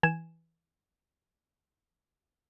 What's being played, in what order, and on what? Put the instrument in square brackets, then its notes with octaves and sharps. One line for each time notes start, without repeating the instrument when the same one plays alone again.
[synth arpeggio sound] E3 G#5 G#6 E7